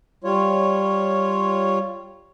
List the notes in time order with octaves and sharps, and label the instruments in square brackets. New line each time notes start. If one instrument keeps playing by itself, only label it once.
[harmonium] G3 F4 C#5